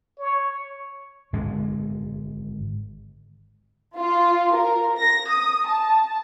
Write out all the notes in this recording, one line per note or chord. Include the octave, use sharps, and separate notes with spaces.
C#5
G#1 D3 G#3
F4
A#4
A#6
D#6
A5